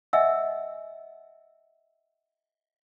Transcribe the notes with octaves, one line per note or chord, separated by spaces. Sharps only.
D#5 E5 F#5 G#5 E6